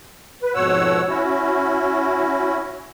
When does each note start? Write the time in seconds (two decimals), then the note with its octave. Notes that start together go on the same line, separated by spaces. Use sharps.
0.42 B4
0.55 F2 G#2 B2 C#5 F#5 E6
1.09 C#4 E4 F#4